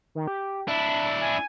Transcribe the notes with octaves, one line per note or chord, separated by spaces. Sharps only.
D#3
G4
D4 E4 E5
G#5